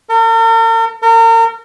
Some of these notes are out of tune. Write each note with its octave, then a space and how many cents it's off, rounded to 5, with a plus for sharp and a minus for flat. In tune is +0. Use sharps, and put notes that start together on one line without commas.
A#4 -45
A#4 -35